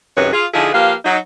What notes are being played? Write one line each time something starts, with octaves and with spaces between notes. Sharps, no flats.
F#2 C3 D#3 G#4 B4 C#5
F4 G#4
D3 F3 D#4 E4 G#4
F3 A#3 G4 B4 F5
F#3 D#4